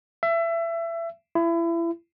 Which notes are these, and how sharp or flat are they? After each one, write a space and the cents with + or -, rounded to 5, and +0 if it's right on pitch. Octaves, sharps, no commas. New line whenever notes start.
E5 +25
E4 +30